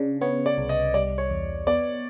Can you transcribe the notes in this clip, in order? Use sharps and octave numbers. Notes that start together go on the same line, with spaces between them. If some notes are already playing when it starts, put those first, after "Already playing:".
Already playing: C#3 D4
B3 C#5
D5
C2
D#5
G3 D5
C#5
E2
B3 D5